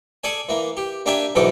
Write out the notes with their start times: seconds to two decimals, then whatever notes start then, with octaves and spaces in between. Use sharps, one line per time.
0.24 G#4 A4 D5 G#5
0.49 E3 A#3
0.77 G4
1.06 A#3 D4 G4 E5 G5 G#5
1.35 B1 G#2 B2 E3 A4 D6